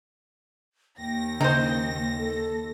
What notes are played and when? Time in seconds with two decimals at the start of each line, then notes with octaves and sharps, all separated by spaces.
0.99 D#2 G5 A#6
1.41 C#3 D#4 C5
2.17 A4